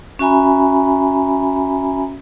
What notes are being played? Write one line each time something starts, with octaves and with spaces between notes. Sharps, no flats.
C#4 F#4 E5 G#5 A#5 B5